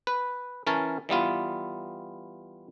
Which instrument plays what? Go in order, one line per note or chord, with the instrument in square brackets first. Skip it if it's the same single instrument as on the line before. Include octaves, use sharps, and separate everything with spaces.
[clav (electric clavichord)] B4
E3 C#4 A#4 C#5 A5
E3 G3 B3 F4